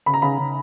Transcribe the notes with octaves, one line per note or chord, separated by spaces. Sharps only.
C#3 B5
A#5
C#3 B5
C#3